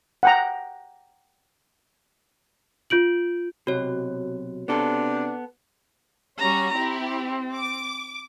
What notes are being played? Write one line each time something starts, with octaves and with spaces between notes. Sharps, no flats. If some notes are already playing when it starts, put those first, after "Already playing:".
F#5 G5 A#5
F4 G6 D7 F#7
B1 C3 F#4 C#5
C3 B3 D4 A4
G3 C#4 F#4 A#5
C4 E4 G4
D6